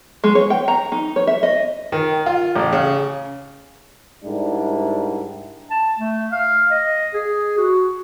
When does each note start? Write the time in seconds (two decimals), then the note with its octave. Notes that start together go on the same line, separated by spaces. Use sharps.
0.24 G#3
0.35 C#5
0.50 G5
0.68 A#5
0.92 D#4
1.16 C#5
1.27 E5
1.43 D#5
1.92 D#3
2.26 F4
2.56 A1
2.73 C#3
4.25 G#2 G3 D4 E4 A#4
5.71 A5
5.99 A3
6.32 F5
6.71 D#5
7.14 G#4
7.57 F#4